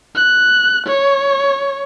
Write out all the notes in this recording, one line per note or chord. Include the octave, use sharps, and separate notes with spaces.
F#6
C#5